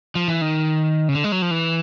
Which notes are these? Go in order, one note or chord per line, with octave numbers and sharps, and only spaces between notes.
F3
E3
D#3
C#3
D3
G#3
F#3
F3
E3